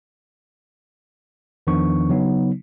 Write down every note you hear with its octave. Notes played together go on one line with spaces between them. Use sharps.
E2 D#3 F3 B3 D4 C#6
C#3 F#3 B3 D#4